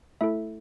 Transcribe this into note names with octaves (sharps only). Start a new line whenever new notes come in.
A3 E4 A4 E5